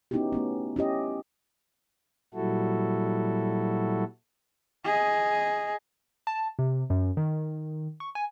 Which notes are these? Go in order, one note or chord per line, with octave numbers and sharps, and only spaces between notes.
B3 C#4 D#4 E4 F#4 G4
A3 B3 C#4
C#4 E4 G4 D#5
A#2 F#3 G3 E4 F#4 A4
G#4 D#5
A5
C3
F#2
D#3
C#6
G#5